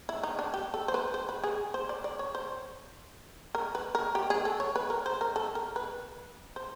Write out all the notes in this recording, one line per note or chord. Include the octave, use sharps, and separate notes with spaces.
E4
D#4
D4
G4
A4
C5
B4
C5
B4
G#4
C5
D5
D5
C#5
C5
A#4
B4
A#4
G4
G#4
A4
C#5
B4
A#4
C5
A#4
A4
A#4
B4
C5